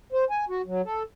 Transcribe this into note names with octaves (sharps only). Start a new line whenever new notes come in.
C5
G#5
F#4
F#3
A4